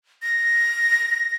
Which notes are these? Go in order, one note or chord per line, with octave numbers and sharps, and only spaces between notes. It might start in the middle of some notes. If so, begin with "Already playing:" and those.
A#6